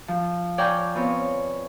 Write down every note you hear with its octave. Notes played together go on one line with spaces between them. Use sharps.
F3
D5 F5 G5 G#5 A#5 C#6
B3 C4 F4 C#5